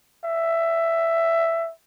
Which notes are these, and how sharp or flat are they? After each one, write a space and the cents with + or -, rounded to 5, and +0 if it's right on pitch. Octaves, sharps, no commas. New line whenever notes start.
E5 +10